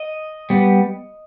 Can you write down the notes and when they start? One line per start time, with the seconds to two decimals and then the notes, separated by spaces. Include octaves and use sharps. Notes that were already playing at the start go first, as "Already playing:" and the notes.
Already playing: D#5
0.50 G3 B3